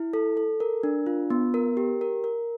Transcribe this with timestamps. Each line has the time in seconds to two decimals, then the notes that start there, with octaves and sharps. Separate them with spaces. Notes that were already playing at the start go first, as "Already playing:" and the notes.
Already playing: E4
0.13 A4
0.37 A4
0.60 A#4
0.83 D4
1.06 F4
1.30 B3
1.54 A#4
1.77 G4
2.01 A#4
2.24 A#4